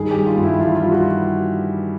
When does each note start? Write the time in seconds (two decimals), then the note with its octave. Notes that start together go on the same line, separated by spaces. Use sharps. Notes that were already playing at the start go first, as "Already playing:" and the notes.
Already playing: G2 D#3 G#4
0.11 G3 G4
0.26 F4
0.37 G2
0.43 E4
0.59 E3 F4
0.75 F4
0.81 G3
0.92 F#4